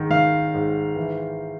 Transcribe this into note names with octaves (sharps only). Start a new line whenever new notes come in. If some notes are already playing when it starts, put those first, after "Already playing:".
Already playing: G#2 D#3
D#3 F5
G#2
E3